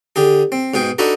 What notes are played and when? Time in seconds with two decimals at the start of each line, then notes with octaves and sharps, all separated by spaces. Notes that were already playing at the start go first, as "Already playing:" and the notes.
0.16 D3 G4 G#4
0.52 C4
0.74 G#2 B2 G#4 G5
0.99 D4 D#4 F#4 A4 B4